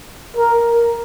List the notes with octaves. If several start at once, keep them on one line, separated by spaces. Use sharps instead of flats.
A#4